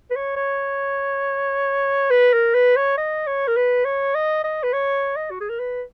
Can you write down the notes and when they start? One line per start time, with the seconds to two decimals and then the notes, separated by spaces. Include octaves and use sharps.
0.11 B4
0.15 C#5
0.36 C#5
2.10 B4
2.33 A#4
2.54 B4
2.76 C#5
2.97 D#5
3.27 C#5
3.48 A#4
3.56 B4
3.85 C#5
4.15 D#5
4.44 D#5
4.63 B4
4.72 C#5
5.16 D#5
5.30 F#4
5.40 G#4
5.49 A#4
5.59 B4